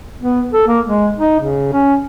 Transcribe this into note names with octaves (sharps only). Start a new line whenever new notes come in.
B3
A4
A#3
G#3
D#4
C#3
C#4